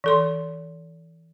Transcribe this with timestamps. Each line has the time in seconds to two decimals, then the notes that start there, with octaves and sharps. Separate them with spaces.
0.04 E3 A4 C6